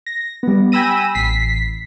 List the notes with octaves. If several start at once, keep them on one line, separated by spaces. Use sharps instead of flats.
A#6
G3 B3
G5 G#5 B5 E6 A#6 D#7
A1 B6 C7